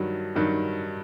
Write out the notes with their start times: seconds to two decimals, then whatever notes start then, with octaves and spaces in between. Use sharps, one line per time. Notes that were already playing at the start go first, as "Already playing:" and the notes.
Already playing: G2 D#3 F#3
0.35 G2 D#3 F#3